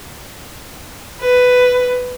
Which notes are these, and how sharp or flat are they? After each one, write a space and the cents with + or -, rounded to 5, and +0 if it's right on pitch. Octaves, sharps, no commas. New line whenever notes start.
B4 +10